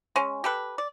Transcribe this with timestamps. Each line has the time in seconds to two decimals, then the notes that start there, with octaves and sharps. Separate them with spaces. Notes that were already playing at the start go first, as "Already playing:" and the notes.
0.16 G#3 C#4
0.44 G4 A4 B4
0.78 D5